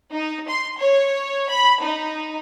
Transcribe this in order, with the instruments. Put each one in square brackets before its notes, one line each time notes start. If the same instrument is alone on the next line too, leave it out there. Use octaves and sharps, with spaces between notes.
[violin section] D#4
C6
C#5
B5
D#4